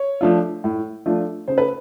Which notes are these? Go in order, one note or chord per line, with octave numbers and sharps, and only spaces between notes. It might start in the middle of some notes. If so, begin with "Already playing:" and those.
Already playing: C#5
F3 A3 D4 F4
A2
F3 A3 D4 F4
C#3 C5
B4